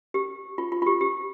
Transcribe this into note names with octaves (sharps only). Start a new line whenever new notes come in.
G4
F4
F4
F4
G4
G4